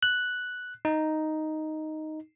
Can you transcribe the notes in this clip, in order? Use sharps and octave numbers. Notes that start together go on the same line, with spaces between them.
F#6
D#4